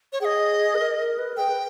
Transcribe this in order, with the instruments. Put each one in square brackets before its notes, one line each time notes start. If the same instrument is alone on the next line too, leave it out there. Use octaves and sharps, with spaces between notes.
[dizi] C#5
[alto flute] G#4 [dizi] G5
[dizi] D#5
[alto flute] B4
A#4
A#4
B4
A#4
[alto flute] G#4 [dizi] G5
[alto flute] B4